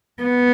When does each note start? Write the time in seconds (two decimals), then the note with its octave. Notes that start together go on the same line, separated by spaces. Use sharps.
0.23 B3